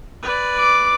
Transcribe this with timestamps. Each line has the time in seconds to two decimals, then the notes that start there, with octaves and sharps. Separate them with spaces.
0.23 B4 D5
0.59 D6